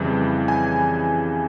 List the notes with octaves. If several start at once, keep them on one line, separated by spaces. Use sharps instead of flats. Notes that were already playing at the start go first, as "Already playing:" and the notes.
Already playing: F2 C#3 E3 G3
G#5